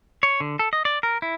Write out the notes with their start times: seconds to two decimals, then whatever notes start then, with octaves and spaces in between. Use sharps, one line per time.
0.23 C#5
0.40 D3
0.59 A4
0.73 D#5
0.85 D5
1.03 A#4
1.22 E4